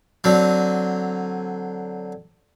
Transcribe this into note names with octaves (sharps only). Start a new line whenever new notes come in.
D3 F#3 C4